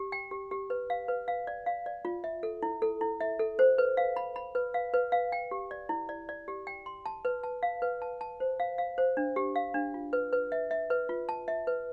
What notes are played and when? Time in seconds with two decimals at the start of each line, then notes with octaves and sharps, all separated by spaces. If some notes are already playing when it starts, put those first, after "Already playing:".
Already playing: G4
0.12 G5
0.31 G4
0.51 G4
0.70 B4
0.90 F5
1.08 B4
1.28 F5
1.47 D5
1.66 F5
1.86 D5
2.05 F4
2.24 E5
2.43 A4
2.63 E4
2.82 A4
3.01 E4
3.21 E5
3.39 A4
3.59 C5
3.78 B4
3.97 F5
4.16 B5
4.36 B5
4.55 B4
4.74 F5
4.94 B4
5.12 F5
5.32 G5
5.51 G4
5.71 D5
5.89 E4
6.09 D5
6.29 D5
6.48 G4
6.67 G5
6.86 C6
7.06 A5
7.25 B4
7.43 A5
7.63 F5
7.82 B4
8.02 A5
8.21 A5
8.40 C5
8.60 F5
8.78 F5
8.98 C5
9.17 D4
9.36 G4
9.56 F5
9.74 D4
9.94 F4
10.13 B4
10.33 B4
10.52 E5
10.71 E5
10.90 B4
11.09 F4
11.29 A5
11.48 E5
11.67 B4